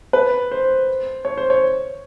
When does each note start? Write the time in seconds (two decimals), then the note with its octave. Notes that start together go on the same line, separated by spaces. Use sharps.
0.13 B4
0.52 C5
1.25 C#5
1.37 C5
1.50 C#5